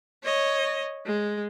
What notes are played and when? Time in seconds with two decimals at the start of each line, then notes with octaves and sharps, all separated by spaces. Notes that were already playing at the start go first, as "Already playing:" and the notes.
0.24 C#5 D#5
1.06 G#3